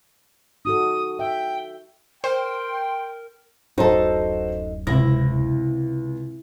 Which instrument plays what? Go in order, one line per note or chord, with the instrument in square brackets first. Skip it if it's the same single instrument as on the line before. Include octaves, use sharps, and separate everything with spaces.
[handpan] D#4 F#4 A4 [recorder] D#6
[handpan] E5 [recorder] G5
[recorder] A#4 [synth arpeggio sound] C5 [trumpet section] G5 [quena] C6
[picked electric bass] D1 F#2 [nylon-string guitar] D#4 A4 [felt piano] F#4 C5
[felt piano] C#2 A#6 [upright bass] C3 [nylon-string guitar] E4